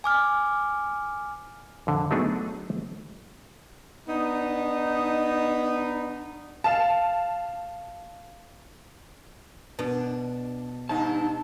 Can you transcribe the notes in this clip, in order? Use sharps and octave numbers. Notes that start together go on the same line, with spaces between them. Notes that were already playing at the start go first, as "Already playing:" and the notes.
G#5 D6 F6
F2 D3
F#3 A3 B3 D4 D#4 G#4
B3 D4 D#4
F5 A5
B2 D4
G2 D#4 A5